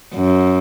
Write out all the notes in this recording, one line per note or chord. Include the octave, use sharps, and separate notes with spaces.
F#2